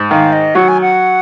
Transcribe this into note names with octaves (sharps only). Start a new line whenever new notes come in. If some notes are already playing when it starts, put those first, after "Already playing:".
Already playing: G#2
D#3 F5
D#5
F#3 F#5
G#5
F#5